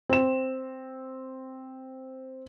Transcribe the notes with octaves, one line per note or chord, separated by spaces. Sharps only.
C4 E7